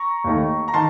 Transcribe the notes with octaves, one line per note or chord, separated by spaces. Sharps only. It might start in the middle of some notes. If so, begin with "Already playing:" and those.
Already playing: A#5 C#6
D#2 D#3 A3
A#5
D#3 A5 C6